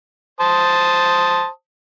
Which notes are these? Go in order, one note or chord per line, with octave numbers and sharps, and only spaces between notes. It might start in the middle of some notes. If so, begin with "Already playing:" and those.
C5 A5 D#6